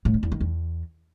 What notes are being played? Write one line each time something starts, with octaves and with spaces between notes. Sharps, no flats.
A2
D3
E2
D#3
E2